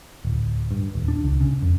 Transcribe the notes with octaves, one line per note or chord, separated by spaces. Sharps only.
D1
G2
D#1
D4
C#2
C#3
F2